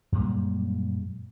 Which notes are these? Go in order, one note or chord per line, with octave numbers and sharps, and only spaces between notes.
F#2 A#2 G3 G#3